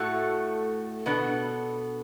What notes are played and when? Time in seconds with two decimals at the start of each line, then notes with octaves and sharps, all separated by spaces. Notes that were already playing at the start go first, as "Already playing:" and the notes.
Already playing: A2 A3 F#4 A4
1.06 B2 B3 D4 A4